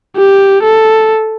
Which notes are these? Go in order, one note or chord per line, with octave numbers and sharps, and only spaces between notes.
G4
A4